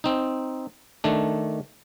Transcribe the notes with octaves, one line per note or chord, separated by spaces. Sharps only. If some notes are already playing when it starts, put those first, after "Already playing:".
C4 D#4
D#3 A3 D4